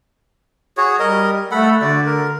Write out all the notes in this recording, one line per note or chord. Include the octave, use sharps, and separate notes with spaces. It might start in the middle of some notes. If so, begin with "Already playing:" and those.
F#4 G#4 C#5
G3 A#4 D#5
A3 A4 F#5 B5
D3 F#4 D5
A#4